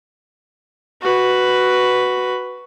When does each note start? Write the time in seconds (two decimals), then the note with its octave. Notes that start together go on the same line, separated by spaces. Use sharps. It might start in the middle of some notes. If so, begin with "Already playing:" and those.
1.01 F#4 B4